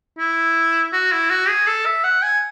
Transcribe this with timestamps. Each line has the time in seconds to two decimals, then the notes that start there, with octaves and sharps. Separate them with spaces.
0.18 E4
0.93 F#4
1.12 E4
1.30 F#4
1.48 G#4
1.67 A4
1.86 E5
2.04 F#5
2.23 G#5